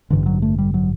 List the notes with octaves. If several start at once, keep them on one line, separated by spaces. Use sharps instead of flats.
A1 G2 D3 E3
F#3
A3
G3
F#3